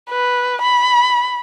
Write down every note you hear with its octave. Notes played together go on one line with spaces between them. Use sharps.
B4
B5